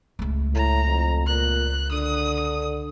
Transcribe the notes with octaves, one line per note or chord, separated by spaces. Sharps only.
C#2 A3
A2 A#5
F2
A#2 F#6
D3 D#6